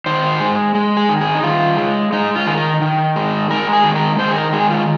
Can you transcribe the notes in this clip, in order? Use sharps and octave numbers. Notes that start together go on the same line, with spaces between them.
D#3 C5
G#3
G#3
G#4
D#3
G#4
D#4
D#3 F4
G#3
G#3 D#4
F4
D#3 G#4
A#4
D#3
G#3
G#3 A#4
G#4
D#3
A#4
D#3 C5
G#4
A#4
G#3 G#4
F4